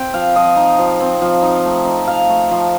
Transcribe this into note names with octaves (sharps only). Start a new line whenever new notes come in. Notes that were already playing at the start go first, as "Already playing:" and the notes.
Already playing: C4 G5
F3 F5
F3 D#5
D#4
F3
C4
F3
D#4
A3
D#4
F3 F5
A3
F3